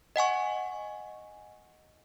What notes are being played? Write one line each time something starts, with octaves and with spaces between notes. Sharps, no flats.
D#5 F#5 G#5 C#6